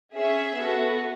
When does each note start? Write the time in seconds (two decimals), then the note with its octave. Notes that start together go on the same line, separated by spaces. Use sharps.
0.14 C#4 G#4 E5
0.57 B3 F#4 A4